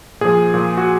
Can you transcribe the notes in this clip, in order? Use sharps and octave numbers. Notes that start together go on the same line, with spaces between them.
A#2 F3 G#4
A#2 F3
F#4